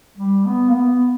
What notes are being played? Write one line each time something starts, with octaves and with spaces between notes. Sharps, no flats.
G3
B3
A#3
B3